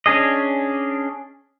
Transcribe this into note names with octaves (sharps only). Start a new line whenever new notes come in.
C#4 D4 G#4 D#5